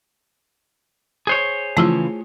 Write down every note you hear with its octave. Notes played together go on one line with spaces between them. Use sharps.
G#4 C5 C#5
C#3 E3 F3 A3 E4 F4